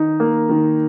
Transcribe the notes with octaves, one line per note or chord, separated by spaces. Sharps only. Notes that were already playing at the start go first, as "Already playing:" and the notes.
Already playing: D#3 D#4
A#3
D#3